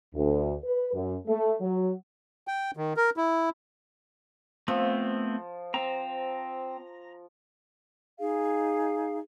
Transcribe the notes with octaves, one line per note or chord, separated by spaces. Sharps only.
D2
B4
F#2
A3
F#3
G5
D#3
A#4
E4
F3 A3 B3 C4
C4 A#5
D#4 G#4 F5